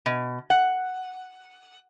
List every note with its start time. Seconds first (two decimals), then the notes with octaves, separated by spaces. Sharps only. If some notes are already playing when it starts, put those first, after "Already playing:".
0.06 B2
0.50 F#5